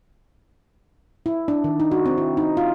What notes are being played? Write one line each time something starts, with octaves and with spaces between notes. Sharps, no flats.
E4
D4
D#3
D#4
F#4
C4
E4
D#4
F4